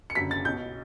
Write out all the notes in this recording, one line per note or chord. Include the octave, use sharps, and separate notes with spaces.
C#7
F#1 F#2 D3 B6
A6
B1 B2 G6